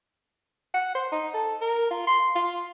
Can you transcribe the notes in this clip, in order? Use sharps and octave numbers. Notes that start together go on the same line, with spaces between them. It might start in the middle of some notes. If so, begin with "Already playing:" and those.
F#5
C5
D#4
A4
A#4
F4
C6
F4